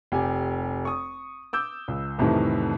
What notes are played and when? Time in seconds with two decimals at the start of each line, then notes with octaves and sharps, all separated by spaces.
0.12 F1 G4 G#5
0.85 C#6 D#6
1.53 D6 E6 G6
1.88 C#2
2.18 C2 F2 A2 C3 D#3 E3